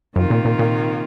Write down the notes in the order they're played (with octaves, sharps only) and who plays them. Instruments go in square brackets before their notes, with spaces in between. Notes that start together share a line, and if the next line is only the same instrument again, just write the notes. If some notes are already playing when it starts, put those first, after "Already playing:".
[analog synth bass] F#2 [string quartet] C3 D#3 A#3 F4
[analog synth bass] A#2
A#2
A#2